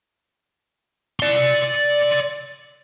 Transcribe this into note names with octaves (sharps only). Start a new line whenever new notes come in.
D5 C6